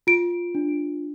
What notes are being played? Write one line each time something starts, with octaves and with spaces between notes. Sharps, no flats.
F4 D7
D4